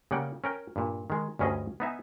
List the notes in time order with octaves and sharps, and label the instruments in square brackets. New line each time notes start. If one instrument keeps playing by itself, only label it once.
[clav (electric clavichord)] C#3 G3 A#3 F#5 G5
C#4 A#4 G5
G2 A#2
D#3 G#3
D2 G2 C#4 G#4 D#5
B3 D#4 E5 G#5